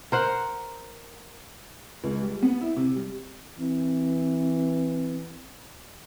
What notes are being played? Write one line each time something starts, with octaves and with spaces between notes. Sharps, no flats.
A#4 C5 F#5
C#2
G3
B3
E4
C3
G3
E3 C4